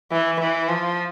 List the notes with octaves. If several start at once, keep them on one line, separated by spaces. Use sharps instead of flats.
E3
E3
F3